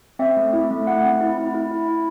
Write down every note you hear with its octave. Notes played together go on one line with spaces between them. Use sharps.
C4 E5
A3
E4
A3
A3 F#5
C4
E4
E4
E4
E4
E4